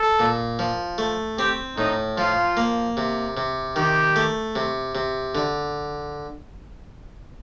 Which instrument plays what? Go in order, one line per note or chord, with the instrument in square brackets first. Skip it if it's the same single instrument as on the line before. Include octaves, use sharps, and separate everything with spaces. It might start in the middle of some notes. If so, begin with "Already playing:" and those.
Already playing: [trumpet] A4
[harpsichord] A#2
F3
A3
[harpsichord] C4 [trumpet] G4
[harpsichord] A2 [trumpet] D#4
[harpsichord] F3 [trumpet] F4
[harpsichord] A#3
C3
C3
[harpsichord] D#3 [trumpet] G4
[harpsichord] A3
C3
C3
D3